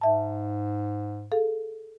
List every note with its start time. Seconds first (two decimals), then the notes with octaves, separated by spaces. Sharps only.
0.01 G#2 E5 A5
1.32 G#4 A4 F5